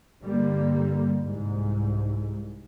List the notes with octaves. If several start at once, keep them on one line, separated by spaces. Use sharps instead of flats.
G2 D3 G3 A#3
C2 G#2